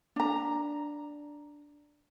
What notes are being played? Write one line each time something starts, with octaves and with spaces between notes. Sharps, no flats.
D4 A#5